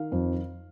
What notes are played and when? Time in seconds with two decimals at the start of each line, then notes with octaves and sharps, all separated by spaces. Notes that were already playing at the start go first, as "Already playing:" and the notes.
Already playing: D#3 F5
0.12 F2